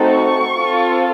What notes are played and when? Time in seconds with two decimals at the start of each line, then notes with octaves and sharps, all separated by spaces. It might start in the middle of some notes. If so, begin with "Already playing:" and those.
Already playing: A3 C4 D#4 F#4 A4
0.11 C#6
0.56 C4 F4 A4